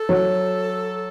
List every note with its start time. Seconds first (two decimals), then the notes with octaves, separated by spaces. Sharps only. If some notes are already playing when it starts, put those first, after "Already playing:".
Already playing: A4
0.09 F#3